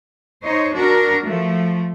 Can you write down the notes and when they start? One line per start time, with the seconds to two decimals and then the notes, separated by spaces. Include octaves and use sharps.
0.42 D#4 C5 C#5
0.74 D4 F#4 A#4
1.23 F3 A3